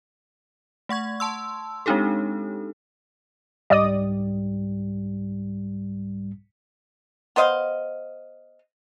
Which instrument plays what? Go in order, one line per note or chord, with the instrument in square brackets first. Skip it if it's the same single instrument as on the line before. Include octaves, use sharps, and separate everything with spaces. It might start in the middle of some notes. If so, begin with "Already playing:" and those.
[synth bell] A3 F#5 C#6 G#6
A5 C6 E6
G#3 C4 D4 D#4 G4 A4
[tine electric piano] C2 G#2 G3 [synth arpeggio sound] D5 D#5 D#6
[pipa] B3 C5 D#5 F5